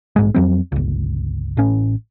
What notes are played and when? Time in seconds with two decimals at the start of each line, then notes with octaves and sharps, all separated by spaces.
0.16 A#1 G#2 G#3
0.34 F2 F#3 C4
0.72 G1 C#2
1.57 A1 A2 C#4